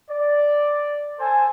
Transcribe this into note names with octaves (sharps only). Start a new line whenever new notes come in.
D5
A4 C5 G#5